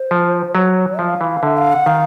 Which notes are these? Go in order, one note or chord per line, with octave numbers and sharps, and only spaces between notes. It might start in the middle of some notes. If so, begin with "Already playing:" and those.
Already playing: C5
F3
F#3 C#5
F3 F5
E3
D3 E5
F5
F#5
D#3 F5